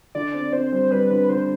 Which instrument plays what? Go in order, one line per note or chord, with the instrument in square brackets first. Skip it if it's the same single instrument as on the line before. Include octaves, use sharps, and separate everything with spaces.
[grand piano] D3 [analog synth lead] D5
[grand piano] C4
[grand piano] C4 [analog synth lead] C5
[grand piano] G3
[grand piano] G3 [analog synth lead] B4
[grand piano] D3 [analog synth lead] B4
[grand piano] D3 [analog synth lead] C5